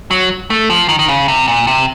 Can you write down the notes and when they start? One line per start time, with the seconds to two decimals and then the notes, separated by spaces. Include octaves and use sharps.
0.11 F#3
0.50 A3
0.70 F3
0.89 D#3
0.99 D#3
1.08 C#3
1.28 C3
1.48 A#2
1.67 C3